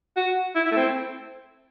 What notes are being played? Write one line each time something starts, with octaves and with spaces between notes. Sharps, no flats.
F#4
E4
E4
A3
C4